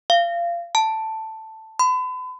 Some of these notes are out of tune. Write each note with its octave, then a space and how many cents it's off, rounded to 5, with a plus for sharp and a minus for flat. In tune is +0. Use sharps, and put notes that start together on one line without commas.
F5 -25
A5 +5
B5 +40